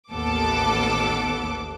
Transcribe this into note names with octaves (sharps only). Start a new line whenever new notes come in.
A1 D#2 B3 A4 D6